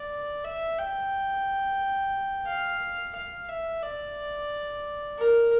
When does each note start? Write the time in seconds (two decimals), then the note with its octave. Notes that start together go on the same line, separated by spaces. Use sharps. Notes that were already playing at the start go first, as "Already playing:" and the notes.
Already playing: D5
0.44 E5
0.79 G5
2.47 F5
3.15 F5
3.49 E5
3.83 D5
5.18 A#4